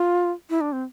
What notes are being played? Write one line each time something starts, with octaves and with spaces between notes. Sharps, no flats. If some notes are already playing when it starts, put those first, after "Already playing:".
Already playing: F4
E4
D4
C4